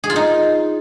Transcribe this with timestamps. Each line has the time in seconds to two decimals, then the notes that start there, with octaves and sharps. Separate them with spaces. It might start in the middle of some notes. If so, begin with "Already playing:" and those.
0.04 G#4
0.10 F4
0.16 D#4